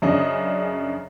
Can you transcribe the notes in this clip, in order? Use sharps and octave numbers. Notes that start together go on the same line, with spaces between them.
F#2 C#3 D4 D#5